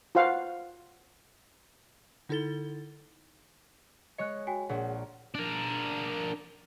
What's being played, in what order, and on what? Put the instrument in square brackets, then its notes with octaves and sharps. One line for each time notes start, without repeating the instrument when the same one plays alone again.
[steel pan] F4 F#4 C5 F5 F#5
[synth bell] D3 D#4 E4 A4 A6 G7
[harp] G#3 C#5 C#7 [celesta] D#5 F#6
[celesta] F#4 G5 G#5
[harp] A#1 [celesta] G#4 C#5 F#5
[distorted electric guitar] D4 A#4